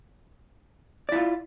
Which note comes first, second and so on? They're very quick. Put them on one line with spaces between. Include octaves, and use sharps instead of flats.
D5 E4 F4